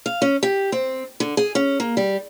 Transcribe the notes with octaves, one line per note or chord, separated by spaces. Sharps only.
F5
C#4
G4
C4
D3
G#4
C#4
A#3
G3